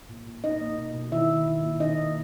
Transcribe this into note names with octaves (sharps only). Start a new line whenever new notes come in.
A#2
A#2
A#2 D#4 D#5
A#3
B2
B2
D#3 E4 E5
D#3
A#2
A#2
D#3 D#4 D#5
A#3